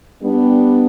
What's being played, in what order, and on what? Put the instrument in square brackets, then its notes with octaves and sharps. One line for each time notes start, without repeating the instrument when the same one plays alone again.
[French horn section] G3 B3 D4